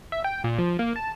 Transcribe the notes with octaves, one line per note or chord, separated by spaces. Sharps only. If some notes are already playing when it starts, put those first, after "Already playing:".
E5
G5
A#2
F3
A#3
A5